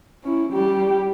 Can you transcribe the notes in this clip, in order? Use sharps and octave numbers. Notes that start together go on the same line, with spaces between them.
C#4 E4
G3 G4